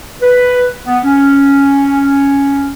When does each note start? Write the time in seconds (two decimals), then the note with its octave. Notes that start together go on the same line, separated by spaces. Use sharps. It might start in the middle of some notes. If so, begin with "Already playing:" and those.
0.22 B4
0.86 B3
1.04 C#4